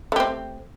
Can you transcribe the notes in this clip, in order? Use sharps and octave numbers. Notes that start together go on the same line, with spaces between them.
A3 C4 G4